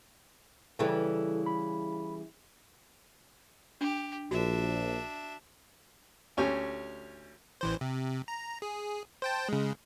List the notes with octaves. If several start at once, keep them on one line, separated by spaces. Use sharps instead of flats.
C#3 E3 G3 A4
B5
D4 G4
A#1 D4 F#4 E5
D2 C#4 G4
A1 E3 C5
C3
A#5
G#4
C5 G5 A5
C#3 G#3